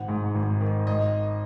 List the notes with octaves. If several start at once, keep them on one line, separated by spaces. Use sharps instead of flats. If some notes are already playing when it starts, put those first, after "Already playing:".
Already playing: G#1 F#5
G#2
G#1
D#3
G#1 D#5